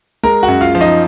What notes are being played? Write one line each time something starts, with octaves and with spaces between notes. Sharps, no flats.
G#3 A#4 A#5
F#4 F#5
F#2
F4 F5
F3
D#4 D#5